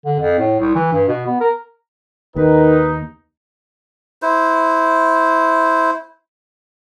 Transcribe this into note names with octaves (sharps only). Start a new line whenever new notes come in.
D3
F2
A2
C2
E3
G2
B2
B3
A#4
D#2 D#3 D#4 B4
E4 C5